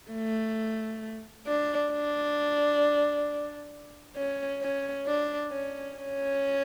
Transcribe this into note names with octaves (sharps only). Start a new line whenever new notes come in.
A3
D4
D4
C#4
C#4
D4
C#4
C#4